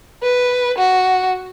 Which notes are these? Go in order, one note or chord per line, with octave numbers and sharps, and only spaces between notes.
B4
F#4